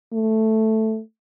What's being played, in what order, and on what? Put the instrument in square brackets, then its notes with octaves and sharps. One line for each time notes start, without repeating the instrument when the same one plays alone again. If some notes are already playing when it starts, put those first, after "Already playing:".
[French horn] A3